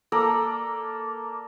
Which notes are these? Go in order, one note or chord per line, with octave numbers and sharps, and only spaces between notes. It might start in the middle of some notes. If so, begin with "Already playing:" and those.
A#3 A4 D5 A#5